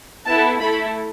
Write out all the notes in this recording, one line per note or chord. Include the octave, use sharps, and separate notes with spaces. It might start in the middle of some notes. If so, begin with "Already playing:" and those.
B3 E4 A4 A5
A3 E4 A4 B5